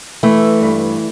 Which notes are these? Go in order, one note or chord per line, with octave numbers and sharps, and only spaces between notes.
E3 A3
G2